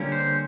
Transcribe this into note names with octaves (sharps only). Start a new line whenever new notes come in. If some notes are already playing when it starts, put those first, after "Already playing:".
Already playing: D3 G3 A#3 C#4
C5